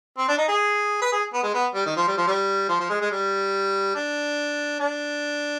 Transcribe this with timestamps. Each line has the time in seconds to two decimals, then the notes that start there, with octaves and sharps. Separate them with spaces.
0.18 C4
0.28 D4
0.38 D#4
0.48 G#4
1.01 B4
1.12 G#4
1.33 B3
1.43 G#3
1.54 B3
1.75 G3
1.86 D#3
1.96 F3
2.07 G3
2.17 F3
2.27 G3
2.69 F3
2.80 F3
2.90 G#3
3.01 G#3
3.11 G3
3.95 D4
4.80 D4